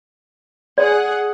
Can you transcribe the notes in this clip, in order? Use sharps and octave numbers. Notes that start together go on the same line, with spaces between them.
G#4 D5 F#5